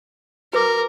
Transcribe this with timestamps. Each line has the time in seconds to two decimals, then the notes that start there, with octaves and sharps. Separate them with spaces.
0.53 F#4 A#4 B4 D6